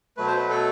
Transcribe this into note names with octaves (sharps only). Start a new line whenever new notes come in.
B2 F#3 A3 B4
C5
B4
A4